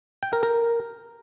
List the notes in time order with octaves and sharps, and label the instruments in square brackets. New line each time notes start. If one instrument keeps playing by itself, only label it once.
[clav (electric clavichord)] G5
A#4
A#4